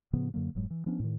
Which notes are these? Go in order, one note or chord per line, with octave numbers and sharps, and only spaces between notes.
A2 C#3 F3 B3
F#2 D3 F#3 A#3
F1 G#2 F#3 G#3
E3
F3 B3 C#4 D4
A2 D#3